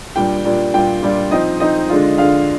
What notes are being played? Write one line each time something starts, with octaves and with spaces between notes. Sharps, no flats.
A#2 G3 D4 G5
A#2 G3 D4
A#2 G3 D4 F4 G5
A#2 G3 D4 F4
F3 C4 D#4 D#5
F3 C4 D#4 D#5
D3 G#3 D4 F4
D3 G#3 D4 F4 F5